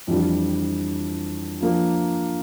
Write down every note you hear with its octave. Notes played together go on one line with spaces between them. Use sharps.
F2 E3 G3 D4
F3 A#3 D4